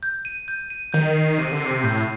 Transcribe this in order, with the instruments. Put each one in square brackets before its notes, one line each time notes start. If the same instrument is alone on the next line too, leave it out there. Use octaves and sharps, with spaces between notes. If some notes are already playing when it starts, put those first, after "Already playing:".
[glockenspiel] G6
D#7
G6
D#7
[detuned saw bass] D#3 [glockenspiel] G6
[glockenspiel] C7
[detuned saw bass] C3 [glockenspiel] D#7
[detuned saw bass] D3
[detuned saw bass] C3 [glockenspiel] C7
[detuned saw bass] A2 [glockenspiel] G6